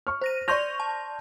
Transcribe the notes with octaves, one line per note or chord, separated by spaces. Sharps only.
C#6 F6
C5 A#6 D#7
D5 C6 C#6 G6 A#6 F7
A5